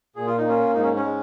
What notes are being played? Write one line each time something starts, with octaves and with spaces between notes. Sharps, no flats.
A#2 G#4
F4
D#4
A#3 C#4 F4
G#2 D#4
C#4
C#4
G#3